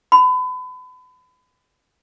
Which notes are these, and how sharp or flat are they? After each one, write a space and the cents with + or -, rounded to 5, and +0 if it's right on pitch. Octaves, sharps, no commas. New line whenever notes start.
B5 +35